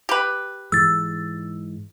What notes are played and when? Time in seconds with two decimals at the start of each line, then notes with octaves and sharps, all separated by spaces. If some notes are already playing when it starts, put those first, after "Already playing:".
0.09 G4 B4
0.72 G#2 E3 G#3 E6 A6